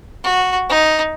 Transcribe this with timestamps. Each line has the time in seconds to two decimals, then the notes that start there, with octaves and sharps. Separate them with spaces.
0.24 F#4
0.69 D#4